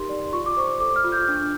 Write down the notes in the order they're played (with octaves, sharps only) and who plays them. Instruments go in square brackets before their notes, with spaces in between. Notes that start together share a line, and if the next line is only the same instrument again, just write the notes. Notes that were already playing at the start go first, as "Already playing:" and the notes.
Already playing: [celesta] D#4 G4 A#4 C6
D5
F4 C#6
D6
C5 C#6
A4 D6
F6
F4
G6
D4